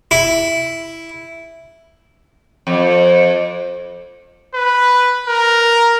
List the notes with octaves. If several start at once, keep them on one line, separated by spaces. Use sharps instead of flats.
E4
F2
B4
A#4